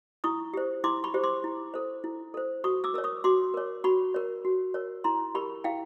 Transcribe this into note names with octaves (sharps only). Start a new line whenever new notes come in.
E4 C#6 D#6
G4 C5
E4 C6 D6
B5 C#6
G4 C5
C6 D6
E4
A4 C5
E4
A4 C5
F#4 C#6 D#6
D6 E6
A#4 C#5 E6
C#6 D#6
F#4 C6 D6
A#4 C#5
F#4 B5 C#6
A#4 C#5
F#4
A#4 C#5
E4 A#5 C6
G4 A#4 B5 C#6
E4 F5 G5